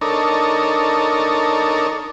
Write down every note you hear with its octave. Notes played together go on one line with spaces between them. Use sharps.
D4 D#4 A4 A#4 C#5